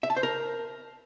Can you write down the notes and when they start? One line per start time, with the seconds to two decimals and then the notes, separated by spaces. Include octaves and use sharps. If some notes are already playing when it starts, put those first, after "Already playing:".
0.03 E5
0.10 A5
0.17 C5
0.23 A#4